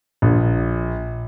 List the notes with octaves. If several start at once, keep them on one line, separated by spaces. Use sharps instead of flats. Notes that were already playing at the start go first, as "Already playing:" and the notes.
A#1